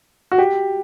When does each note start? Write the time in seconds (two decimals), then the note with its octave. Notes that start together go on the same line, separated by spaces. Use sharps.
0.32 F#4
0.38 G4